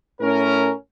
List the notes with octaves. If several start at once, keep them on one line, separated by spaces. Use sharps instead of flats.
A2 C#4 A#4